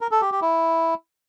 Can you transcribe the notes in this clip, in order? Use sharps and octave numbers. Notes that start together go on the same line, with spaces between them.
A#4
A4
G4
G4
E4